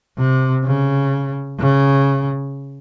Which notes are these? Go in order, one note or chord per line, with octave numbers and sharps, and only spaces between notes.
C3
C#3
C#3